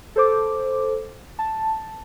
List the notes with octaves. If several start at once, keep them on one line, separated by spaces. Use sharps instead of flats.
A4 C5 D6
A5